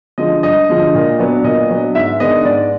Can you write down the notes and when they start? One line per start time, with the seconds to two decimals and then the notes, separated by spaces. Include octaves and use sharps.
0.18 D3 F3 G#3 D#5
0.43 G2 D#5
0.69 D3 F3 G#3
0.94 A#2
1.19 F#3 B3 D4
1.44 A#2 D#5
1.69 F#3 B3 D4
1.95 G#2 E5
2.20 D#3 G#3 B3 D4 D#5
2.45 G#2 D5